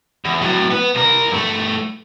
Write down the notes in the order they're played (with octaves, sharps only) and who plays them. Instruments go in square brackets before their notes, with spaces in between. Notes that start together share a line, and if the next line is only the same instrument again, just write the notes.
[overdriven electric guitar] E2
A2 F#3
B3 B4
C2 A#4
G2 A3